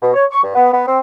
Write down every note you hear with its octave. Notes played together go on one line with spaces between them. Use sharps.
B2
C#5
C#6
G2
B3
B3
C4